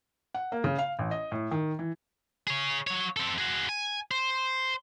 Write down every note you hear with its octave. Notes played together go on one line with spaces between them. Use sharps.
F#5
A#3
C#3
F5
A1
D#5
A2
D#3
E3
G#4 C#5
F#3 C#5
C4 A4
F#4 G#4
G#5
C5